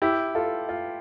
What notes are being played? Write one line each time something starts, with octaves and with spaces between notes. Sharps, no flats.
E4 G4
F4 A4
F4